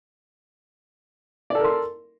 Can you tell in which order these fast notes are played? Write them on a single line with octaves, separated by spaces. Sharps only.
D5 A4 A#4 C6